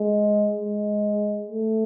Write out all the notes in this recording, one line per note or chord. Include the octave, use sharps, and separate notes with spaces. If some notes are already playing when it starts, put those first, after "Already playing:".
Already playing: G#3
G#3
A3